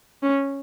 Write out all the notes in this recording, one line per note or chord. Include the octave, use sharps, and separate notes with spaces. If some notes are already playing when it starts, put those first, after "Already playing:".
C#4